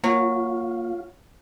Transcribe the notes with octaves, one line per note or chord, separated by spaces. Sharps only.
F#3 A#3 F4